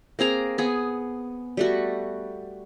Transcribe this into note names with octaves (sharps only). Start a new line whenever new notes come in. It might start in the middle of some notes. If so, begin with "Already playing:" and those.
A#3 C4 G#4 A#5
B3 G#4
G3 A3 F#4